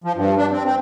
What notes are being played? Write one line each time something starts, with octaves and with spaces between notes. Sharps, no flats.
F3
G2
D4
C4
C4